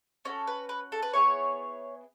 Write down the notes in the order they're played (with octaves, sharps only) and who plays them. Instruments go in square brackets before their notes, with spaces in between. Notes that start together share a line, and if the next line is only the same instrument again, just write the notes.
[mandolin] C#4 F#4 A4 C#5
B4
B4
A4
B4
B3 E4 G#4 C#5